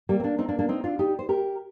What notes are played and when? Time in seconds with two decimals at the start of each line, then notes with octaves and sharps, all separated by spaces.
0.09 G3 A#3
0.20 C4
0.24 A#3 D4
0.38 C4 D#4
0.49 A#3 D4
0.59 A#3 D4
0.69 C4 D#4
0.84 D4 F4
0.99 D#4 G4
1.19 C5
1.29 G4 A#4